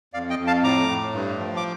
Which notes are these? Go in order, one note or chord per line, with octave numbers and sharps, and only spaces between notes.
F2 D5 F5
D#5 G5
F2
F5 A5
A2 A#5 D6
A2
G2
F3
D6